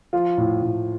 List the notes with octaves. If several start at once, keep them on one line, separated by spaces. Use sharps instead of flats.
F3 F4
A2
A2